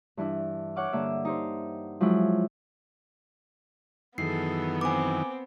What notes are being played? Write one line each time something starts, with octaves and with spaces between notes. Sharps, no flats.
G2 E3 D4 E4
C#5 F#5 D6 F6
G2 D3 A#3 E5
D#4 G4 C5
F3 F#3 G#3 E4
F#2 D#3 E3 B3 G#4 A4 C7
C4 G#5 D6